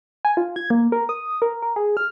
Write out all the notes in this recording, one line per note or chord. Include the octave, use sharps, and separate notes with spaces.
G#5
F4
G#6
A#3
A#4
D#6
A#4
A#4
G#4
F6